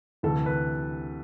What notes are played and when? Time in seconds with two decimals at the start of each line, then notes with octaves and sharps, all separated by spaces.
0.23 D2 C3 E3 A4
0.46 B4